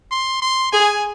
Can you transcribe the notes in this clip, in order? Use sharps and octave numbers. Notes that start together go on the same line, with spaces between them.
C6
C6
G#4 G#5